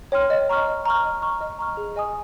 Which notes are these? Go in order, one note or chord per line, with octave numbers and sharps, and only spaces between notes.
C#5 G5 C6 F6
D#5
A#5 C#6 F6
D#5
A#5 C#6 F6
D#5
A#5 C#6 F6
D#5
A#5 C#6 F6
G#4
D#5 G#5 D#6